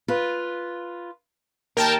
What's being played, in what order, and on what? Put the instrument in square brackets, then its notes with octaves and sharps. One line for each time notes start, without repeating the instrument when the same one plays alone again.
[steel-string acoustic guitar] F4 B4
[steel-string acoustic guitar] D#2 [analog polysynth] A#4 G5 A5